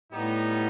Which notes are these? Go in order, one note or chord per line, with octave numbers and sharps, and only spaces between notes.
A2 G3 B3 D#4